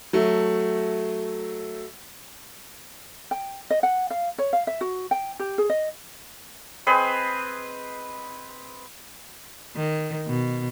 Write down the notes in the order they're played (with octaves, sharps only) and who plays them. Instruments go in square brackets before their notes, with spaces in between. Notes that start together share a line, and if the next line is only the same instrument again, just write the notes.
[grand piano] F#3 A3
[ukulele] G5
D#5
F#5
F5
C#5
F5
E5
F#4
G5
G4
G#4
D#5
[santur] C4 G#4 B4 D#5
[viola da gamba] D#3
B2